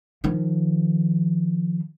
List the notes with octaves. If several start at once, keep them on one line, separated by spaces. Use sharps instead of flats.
D#3 F3